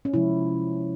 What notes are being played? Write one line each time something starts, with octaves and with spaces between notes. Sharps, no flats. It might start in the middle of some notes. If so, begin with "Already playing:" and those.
C#4
C3 F3 G#3 E4